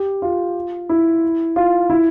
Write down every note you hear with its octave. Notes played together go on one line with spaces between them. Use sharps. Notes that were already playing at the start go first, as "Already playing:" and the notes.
Already playing: G4
F4
E4
F4
E4